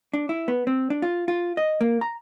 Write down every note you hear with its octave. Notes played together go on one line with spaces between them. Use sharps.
D4
E4
B3
C4
D4
F4
F4
D#5
A#3
A#5